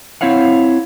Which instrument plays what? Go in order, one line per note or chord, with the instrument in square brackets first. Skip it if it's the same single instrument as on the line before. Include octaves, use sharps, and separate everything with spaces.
[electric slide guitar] C4 E4 C#5 F5 F#5